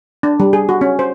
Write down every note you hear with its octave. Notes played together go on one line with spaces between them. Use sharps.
D4
G3
G#4
F#4
C#4
C5